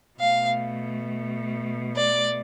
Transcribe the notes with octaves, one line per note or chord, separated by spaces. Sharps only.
B2 A3 F5
D5